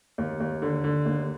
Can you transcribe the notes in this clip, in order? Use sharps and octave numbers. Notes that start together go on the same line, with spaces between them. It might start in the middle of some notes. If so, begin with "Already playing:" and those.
D#2
D#2
D3
D3
D#2